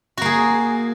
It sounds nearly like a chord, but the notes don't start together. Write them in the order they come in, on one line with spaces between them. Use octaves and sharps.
F#4 A#3 G#4